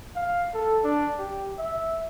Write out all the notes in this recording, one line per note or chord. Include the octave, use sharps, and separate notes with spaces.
F5
A4
D4
G4
E5